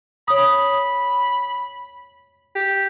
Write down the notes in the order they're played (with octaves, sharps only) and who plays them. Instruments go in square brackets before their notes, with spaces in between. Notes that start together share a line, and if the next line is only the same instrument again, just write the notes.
[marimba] C#5 D#6 [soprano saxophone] B5
[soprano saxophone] G4